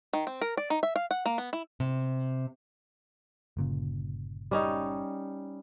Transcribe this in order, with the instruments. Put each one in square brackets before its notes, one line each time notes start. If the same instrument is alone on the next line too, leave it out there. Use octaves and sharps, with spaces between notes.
[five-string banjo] D#3
C4
A#4
D5
D#4
E5
F5
F#5
A#3
B3
E4
[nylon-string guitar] C3
[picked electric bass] G1 A#2 C#3
[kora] G3 C#4 D#4